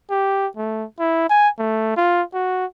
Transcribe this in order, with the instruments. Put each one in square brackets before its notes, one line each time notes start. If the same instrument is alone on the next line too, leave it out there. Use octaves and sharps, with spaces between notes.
[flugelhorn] G4
A3
E4
G#5
A3
F4
F#4